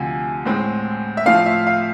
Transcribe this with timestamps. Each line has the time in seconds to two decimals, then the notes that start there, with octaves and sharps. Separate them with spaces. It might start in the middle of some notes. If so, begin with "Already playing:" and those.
Already playing: D2 C3 F3 G#5
0.45 A2 G#3 C4
1.17 E5
1.26 A2 F3 A3 C4 F5
1.46 E5
1.67 F5